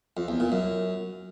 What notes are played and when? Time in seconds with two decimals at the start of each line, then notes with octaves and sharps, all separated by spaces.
0.17 F2
0.28 E2
0.40 A#2
0.52 F#2